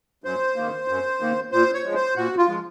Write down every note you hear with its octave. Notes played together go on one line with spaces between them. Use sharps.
F#2 C5
D#3 A#3
F#2
D#3 A#3
A#2 C5
C#5
F3 G#3
C5
A#2 F#4
F4
F3 G#3